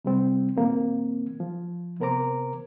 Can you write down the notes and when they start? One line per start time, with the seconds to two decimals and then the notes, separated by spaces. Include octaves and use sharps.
0.05 C3 G3 C4
0.56 A#2 D#3 A#3 C4
1.40 F3
2.00 C3 B3 A#4 C5 A#5 D6